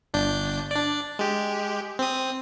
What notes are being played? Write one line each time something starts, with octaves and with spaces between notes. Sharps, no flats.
G1 D4 G6
D4 D5
G#3 G4
C4 D#6